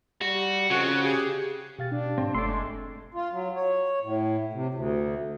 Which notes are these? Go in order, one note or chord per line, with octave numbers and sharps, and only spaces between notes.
G3 F#4
F2 C#3 F#4
G4 G#4
B2 G4 F5 A6
D4
G#2 C4
F#1 A3 D5 C6 E6
G#3
F4
F#3
C#5
A2
C3
D2